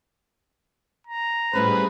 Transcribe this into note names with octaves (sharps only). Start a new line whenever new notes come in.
A#5
A2 G3 C#4 G#4 B4 C5